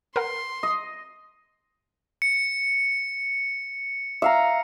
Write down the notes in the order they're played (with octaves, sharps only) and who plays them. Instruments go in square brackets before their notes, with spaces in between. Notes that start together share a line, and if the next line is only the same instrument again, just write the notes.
[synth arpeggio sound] A#4 B4 F#5 [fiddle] C6
[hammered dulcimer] D#5
[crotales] C#7
[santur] E5 F5 A#5